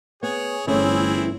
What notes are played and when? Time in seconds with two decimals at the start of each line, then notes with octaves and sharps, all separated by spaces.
0.23 B3 G#4 C#5
0.67 G1 E3 A3 C4 C#4 E4 G#4